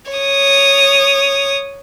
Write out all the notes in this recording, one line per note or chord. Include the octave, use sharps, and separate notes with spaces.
C#5 D#6